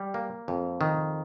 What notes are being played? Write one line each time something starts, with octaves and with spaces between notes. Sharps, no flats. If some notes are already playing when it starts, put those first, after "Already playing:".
Already playing: G3
A#3
F2
D#3